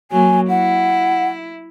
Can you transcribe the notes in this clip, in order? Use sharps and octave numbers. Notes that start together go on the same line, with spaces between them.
F#3 A#3 G#5
E4 F#5